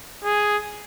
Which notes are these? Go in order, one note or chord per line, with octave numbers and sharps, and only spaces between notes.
G#4